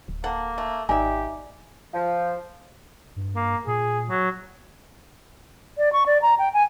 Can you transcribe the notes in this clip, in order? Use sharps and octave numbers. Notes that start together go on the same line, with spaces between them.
D1
A#3 A4 F#5
A3
G#1 D#4 G4 D5 E5 G#5
F3
G2
A#3
A#2 G#4
F#3
D5
C#6
D5
A#5
G5
G#5